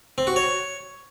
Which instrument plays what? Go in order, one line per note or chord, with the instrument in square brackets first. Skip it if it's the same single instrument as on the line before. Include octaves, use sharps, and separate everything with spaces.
[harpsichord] C4
F#4
C#5